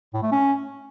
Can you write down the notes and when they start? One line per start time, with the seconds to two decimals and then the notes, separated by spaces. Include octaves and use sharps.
0.14 A2
0.23 A3
0.32 C#4